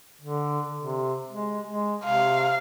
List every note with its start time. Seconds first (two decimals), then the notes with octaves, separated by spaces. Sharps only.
0.21 D3
0.79 C3
1.31 G#3
1.68 G#3
2.04 C3 F5